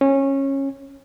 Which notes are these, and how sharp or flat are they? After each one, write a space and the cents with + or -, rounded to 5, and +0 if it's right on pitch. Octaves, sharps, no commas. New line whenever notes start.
C#4 -20